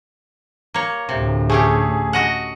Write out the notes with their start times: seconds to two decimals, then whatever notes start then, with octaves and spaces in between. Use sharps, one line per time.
0.74 A#3 C#5
1.09 D2 A2 C3
1.50 A3 C#4 G4 G#4
2.13 F#4 D#5 F#5